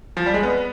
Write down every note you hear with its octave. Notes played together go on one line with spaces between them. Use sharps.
F3
G3
G#3
B3